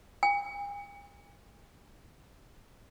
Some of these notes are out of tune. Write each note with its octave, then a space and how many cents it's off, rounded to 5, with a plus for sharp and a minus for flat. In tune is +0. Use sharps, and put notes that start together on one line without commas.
G#5 -45